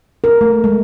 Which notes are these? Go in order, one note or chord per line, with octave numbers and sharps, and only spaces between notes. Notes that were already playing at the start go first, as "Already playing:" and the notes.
A#4
A3
G#3